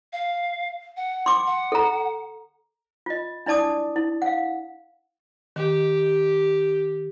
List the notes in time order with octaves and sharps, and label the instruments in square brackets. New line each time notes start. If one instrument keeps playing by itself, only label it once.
[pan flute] F5
F#5
[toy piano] C6 D6
[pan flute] F#5
[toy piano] A4 A#5
F4 D#5
D4 E4 D5 A5 D6 D#6
E4
F5 F#5
[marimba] D#3 [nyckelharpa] G4